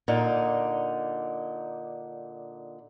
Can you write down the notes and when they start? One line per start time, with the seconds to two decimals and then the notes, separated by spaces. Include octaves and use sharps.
0.08 A#2 D3 D#4